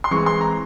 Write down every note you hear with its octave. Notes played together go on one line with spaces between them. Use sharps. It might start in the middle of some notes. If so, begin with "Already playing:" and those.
C6
E3 G#3 C4 C#6
C6
A#5